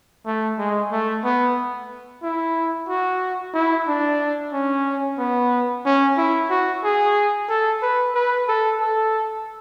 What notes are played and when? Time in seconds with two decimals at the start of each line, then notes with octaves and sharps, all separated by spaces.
0.26 A3
0.58 G#3
0.92 A3
1.24 B3
2.23 E4
2.89 F#4
3.54 E4
3.87 D4
4.53 C#4
5.18 B3
5.85 C#4
6.17 E4
6.50 F#4
6.84 G#4
7.49 A4
7.82 B4
8.15 B4
8.48 A4
8.81 A4